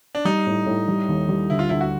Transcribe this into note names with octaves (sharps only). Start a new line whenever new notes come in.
D4
G3 D#4
A2
A2
G3
D#2
G3
D2 E4
F4
D2 E4
F#4